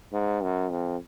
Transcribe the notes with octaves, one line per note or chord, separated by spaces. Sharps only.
G#2
F#2
F2